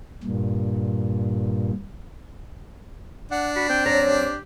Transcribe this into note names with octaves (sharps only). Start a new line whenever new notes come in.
G2 A#2
D4 F#5
F#4 B5
C4 G5
F#2 C#5 A#5
G4